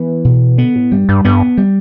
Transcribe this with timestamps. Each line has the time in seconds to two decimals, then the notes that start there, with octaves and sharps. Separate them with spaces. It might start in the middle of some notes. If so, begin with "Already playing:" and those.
Already playing: E3 B3
0.25 B2
0.58 D3 B3
0.75 A2
0.92 G2 G3
1.09 G2
1.25 G2 B3
1.58 G3